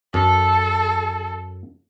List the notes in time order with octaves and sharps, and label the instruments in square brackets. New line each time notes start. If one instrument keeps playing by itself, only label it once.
[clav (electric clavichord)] F#2 [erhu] A4